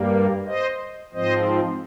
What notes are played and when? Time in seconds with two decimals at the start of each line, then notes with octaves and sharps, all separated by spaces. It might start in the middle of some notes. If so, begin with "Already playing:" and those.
Already playing: G2 G3 A#3
0.46 C5 D#5
1.14 G#2 F3 C4 C5 D#5